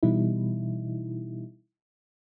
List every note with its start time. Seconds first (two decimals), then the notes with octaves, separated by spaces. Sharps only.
0.03 B2 E3 G3 D#4 E4